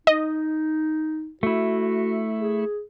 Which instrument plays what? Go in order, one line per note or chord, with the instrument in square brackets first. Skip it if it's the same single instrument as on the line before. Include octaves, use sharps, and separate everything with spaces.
[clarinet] D#4 [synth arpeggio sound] D#5
[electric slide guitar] A3 E4 [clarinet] F#4
[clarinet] G#4